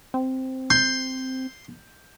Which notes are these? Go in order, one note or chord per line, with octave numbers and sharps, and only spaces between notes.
C4
C6 G6